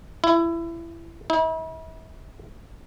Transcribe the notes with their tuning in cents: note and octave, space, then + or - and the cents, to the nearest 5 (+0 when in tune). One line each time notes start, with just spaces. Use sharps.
E4 +20
E4 -45